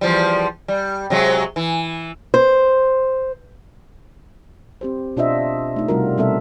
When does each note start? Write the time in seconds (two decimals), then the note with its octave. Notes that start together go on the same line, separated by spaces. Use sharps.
0.01 E2 F3 G3
0.68 G3
1.10 C3 F#3 G#3
1.56 E3
2.34 C5
4.81 C4 G4 C5
5.17 B2 D4 F4 C5 D#5 E5
5.76 A3 D#4
5.88 C3 G3 F4 F#4 A#4
6.18 B2 G3 B3 C4 A4 E5